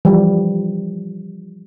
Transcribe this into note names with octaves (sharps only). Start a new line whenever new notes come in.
E3 F3 G3